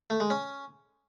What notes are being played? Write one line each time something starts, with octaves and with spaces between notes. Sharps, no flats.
A3
G#3
C#4